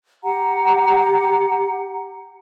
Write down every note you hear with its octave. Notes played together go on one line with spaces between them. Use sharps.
G4 F#5 A#5